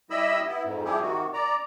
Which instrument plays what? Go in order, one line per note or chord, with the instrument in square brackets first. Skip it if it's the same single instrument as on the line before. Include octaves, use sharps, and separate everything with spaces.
[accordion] G3 E4 D#5 E5 B5 E6
B3 E4
F2 G#2
F3 G3 E4 G4 G#4
C3 D#3 F#4
D5 A#5